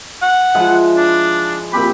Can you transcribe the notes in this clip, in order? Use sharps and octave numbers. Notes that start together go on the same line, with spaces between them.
F#5
F3 G#3 E4
D4
A#2 C4 G4 B5